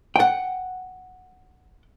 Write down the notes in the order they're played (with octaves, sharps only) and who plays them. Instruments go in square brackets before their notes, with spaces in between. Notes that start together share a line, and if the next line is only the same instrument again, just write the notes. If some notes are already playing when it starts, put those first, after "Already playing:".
[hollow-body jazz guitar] F#5 G5